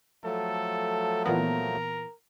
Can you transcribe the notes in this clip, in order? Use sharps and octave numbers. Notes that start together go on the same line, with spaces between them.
F3 F#3 A3 A4
A#2 E3 B3 A#4